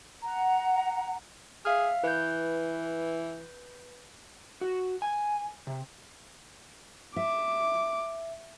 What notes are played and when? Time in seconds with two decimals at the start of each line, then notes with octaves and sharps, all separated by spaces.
0.22 F#5 A#5
1.65 G#4 E5 F5 F6
2.04 E3 B4 G6
4.61 F#4
5.02 G#5
5.67 C3
7.16 E5 D6